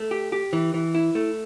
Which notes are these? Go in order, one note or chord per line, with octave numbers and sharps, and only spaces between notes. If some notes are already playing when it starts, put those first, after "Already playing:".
Already playing: A3
G4
G4
E3
E3
E4
A3